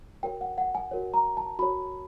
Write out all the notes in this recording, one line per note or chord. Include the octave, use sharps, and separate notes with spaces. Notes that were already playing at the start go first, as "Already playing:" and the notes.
F#4 A#4 C#5 G5
F#5
F#5
G#5
F#4 A#4 C#5
A#5
A5
F#4 A#4 C#5 B5